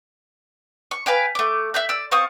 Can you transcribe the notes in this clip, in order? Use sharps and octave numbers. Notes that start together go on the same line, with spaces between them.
C#6
B4 F5 G5 G#5
A3 D6
E5 F#6 G6
D5 E6
C4 F4 C#6 D#6